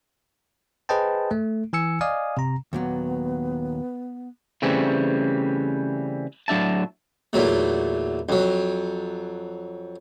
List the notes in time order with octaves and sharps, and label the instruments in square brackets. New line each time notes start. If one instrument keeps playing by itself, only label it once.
[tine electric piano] G#4 B4 C5 D#5 G5 A5
A3
E3 G#5 E6 C#7
D5 D#5 F5 G#5 D#6
C3 A#5
[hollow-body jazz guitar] D#2 A#2 F#3 [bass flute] B3
[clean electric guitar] C#3 E3 G3 A3 C4 C#4
A2 F#3 D4 E5 A5
[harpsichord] E2 A#2 F#3 A3
F2 F#3